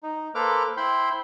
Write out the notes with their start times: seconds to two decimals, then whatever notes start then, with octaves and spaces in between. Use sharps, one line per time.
0.03 D#4
0.35 A#3 A4 B4 C5 D6 F6
0.77 E4 C5 G5 B5 C6